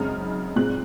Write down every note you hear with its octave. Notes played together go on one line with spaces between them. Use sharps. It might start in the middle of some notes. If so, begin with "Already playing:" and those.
Already playing: F#2 C#3 G#3 C4 D#4 F6
A#2 G#3 C4 F#6